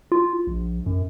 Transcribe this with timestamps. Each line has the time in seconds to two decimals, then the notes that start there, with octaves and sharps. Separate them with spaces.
0.12 F4
0.47 A#1
0.86 F#2